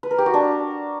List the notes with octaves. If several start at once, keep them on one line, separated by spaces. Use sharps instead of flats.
B4
A#4
G4
F#4
D4